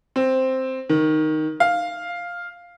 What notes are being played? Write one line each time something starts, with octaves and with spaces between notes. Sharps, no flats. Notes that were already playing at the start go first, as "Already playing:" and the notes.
C4
D#3
F5